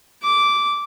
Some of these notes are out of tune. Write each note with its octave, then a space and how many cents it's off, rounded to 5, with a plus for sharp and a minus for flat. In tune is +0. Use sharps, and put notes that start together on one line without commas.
D6 -10